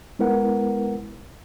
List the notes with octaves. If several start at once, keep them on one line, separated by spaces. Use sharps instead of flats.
G#3 B3 E4 A#4 B4 F#5